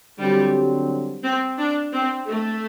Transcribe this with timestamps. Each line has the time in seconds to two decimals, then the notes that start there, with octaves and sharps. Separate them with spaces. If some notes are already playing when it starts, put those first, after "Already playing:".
0.19 D3 F#3 G3 C4
1.23 C4
1.59 D4
1.93 C4
2.27 A3